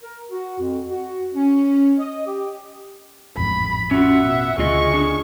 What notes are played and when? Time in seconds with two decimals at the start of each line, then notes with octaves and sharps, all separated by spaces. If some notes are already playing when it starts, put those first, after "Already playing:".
0.02 A#4
0.31 F#4
0.59 F2
0.89 F#4
1.35 C#4
1.99 D#5
2.26 G4
3.37 A1 F2 G#2 B5
3.91 C#4 F4 F#4 E5 F#5
4.22 B2
4.58 D2 C#3 F4 G#4 D#5 C#6
4.92 D3 D4 G#5